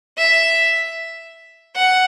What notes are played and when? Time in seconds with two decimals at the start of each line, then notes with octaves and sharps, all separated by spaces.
0.18 E5
1.76 F#5